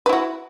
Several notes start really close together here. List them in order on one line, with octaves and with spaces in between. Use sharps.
B4 E4 F#4